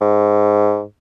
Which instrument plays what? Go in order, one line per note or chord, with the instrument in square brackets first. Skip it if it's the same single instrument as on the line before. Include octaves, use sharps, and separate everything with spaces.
[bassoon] G#2